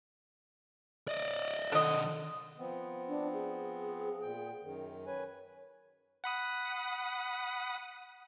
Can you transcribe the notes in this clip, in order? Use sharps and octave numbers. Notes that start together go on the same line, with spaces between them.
D5 D#5
D#3 D4 A4 D#5
F3 B3 C4
D4
G#4
A#2 G5
F#2 D#3
B4 C#5 G#5
F#5 B5 D#6